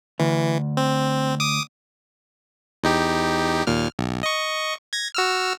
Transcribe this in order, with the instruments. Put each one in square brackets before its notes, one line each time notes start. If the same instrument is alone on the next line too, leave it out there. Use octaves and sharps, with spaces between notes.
[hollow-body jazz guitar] D2 [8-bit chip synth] E3
[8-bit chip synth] C4
D6 D#6
E2 D#4 G4
D#2 A#2 F6
B1
D#5 C#6
G#6 A#6
F#4 E6 F6